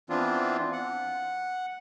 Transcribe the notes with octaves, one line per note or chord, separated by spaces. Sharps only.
E3 B3 C4 D4 F4
F#5